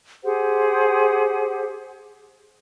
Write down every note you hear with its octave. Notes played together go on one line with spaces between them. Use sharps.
G4 G#4 C5 F#5